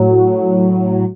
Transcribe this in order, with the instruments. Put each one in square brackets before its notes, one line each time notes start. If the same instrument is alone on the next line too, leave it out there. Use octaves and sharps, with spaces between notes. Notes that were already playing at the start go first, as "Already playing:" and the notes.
Already playing: [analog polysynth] A2 F#3